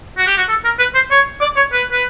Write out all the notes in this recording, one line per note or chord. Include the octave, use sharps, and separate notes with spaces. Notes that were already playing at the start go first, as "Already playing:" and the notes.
F#4
G4
F#4
A4
A#4
B4
C5
C#5
D5
C#5
B4
B4